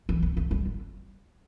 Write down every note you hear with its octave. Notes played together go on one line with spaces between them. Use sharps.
E3
B3
A3
G3
D3